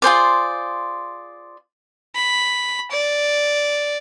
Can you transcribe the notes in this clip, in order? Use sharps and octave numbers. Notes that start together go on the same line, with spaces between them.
F4 G#4 C5 D5
B5
D5